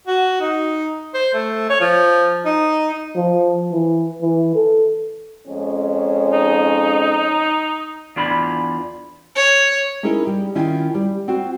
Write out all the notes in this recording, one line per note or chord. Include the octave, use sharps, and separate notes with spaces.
F#4
D#4
C5
A3
C#5
F3
D#4
F3
E3
E3
A4
F2 G#3 C#4
D#4
E2 D4 F4 B5
C#5
C#4 D#4 E4 G#4 A#4 D#5
G3
D#3 C#4 E4 F4
G3
C4 F4 F#4